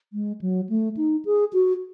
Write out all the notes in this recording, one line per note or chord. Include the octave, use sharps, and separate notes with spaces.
G#3
F#3
A3
D#4
G#4
F#4